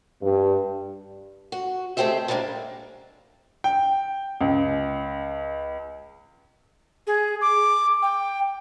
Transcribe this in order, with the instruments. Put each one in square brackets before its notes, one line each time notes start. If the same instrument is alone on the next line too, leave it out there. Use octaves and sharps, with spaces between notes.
[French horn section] G2
[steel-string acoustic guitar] F#4
G#3 A3 C4 G4 C5 E5
D3 G3 G#3 A#3 D4
[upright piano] G5
C#2
[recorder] G#4
D6
G5